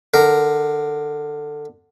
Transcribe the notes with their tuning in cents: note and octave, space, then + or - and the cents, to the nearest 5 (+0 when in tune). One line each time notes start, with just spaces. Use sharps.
D3 +15 A#4 +0